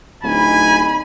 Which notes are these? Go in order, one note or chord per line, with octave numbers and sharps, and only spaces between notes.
D1 D#4 G#5 B5